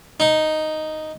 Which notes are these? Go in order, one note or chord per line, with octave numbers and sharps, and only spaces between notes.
D#4